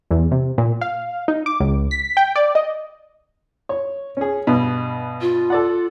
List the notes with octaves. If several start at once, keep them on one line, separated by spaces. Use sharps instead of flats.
E2
C3
A#2
F5
D#4
D6
C#2
B6
G5
D5
D#5
C#5
C#4 G#4
G2 B2
F4
A4 D5 F#5